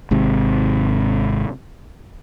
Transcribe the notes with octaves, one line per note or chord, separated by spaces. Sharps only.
G#1 G#2 C3